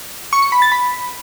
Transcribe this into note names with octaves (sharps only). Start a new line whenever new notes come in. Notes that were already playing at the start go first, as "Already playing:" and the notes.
C#6
C#7
B5
A6
B5